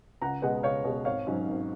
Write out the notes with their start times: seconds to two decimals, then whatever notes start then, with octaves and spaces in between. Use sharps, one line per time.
0.22 C#2 F#5 A#5
0.42 B2 G#3 B3 D#5 F#5
0.63 C#2 C#5 F5
0.84 B2 G#3 B3
1.05 G#1 C#5 F5
1.27 G#2 F#3 C#4
1.47 G#1